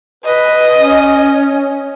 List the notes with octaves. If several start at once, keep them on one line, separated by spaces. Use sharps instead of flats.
B4 D#5
C#4